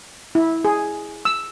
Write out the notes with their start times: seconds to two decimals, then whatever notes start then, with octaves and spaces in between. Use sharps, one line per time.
0.35 E4
0.65 G#4
1.25 E6